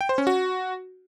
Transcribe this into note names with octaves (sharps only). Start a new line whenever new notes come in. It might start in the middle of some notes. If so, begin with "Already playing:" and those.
G5
C5
C#4
F#4